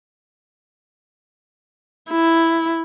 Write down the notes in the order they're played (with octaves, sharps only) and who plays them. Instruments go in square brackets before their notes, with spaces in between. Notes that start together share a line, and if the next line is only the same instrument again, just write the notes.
[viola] E4